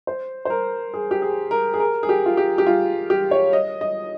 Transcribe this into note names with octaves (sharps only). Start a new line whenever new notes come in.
C5
C5
A#4
G#4
G4
G#4
A#4
G#4
A#4
G#4
G4
F4
G4
G4
F4
G4
C#5
D#5
D#5